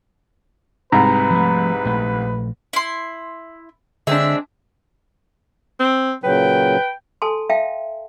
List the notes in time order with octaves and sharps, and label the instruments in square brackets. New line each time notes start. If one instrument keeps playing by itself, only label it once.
[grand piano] C2 G#2 C3 [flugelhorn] B4 [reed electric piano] A#5
[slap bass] F3 A3
A#1 A3
[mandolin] E4 C6
[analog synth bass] D3 [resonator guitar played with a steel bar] G#3 C4 D4 [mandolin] E5
[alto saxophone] C4
[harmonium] A#2 C#3 F#3 [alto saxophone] B4 [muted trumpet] G5
[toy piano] A4 G#5 A5 C6
E5 F5 G5 A5